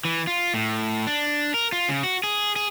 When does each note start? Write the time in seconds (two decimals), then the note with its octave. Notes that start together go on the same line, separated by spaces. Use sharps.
0.05 E3
0.27 F4
0.54 A2
1.07 D4
1.54 A#4
1.72 F4
1.89 C#3
2.03 F#4
2.24 G#4
2.56 G#4